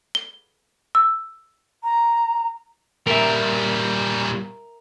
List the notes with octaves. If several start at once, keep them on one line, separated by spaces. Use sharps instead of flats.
G7
E6
A#5
A#2 G3 A#4 E5